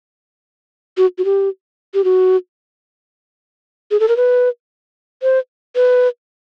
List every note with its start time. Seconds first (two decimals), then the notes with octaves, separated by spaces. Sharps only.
0.97 F#4
1.18 F#4
1.25 G4
1.94 G4
2.04 F#4
3.91 G#4
4.00 A4
4.08 A#4
4.17 B4
5.23 C5
5.76 B4